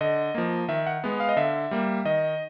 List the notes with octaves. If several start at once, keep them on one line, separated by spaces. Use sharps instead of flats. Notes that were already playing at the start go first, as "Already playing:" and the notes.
D3 D#5
F3 A#3
D#3 E5
F#5
G#3 B3
F5
D#5
D3 E5
G3 A#3
D#3 D#5